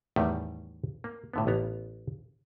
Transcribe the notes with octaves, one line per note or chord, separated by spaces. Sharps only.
E2 A2 D#3 G3 A3
A#3
A2 D3 B3
A1 B3 A#5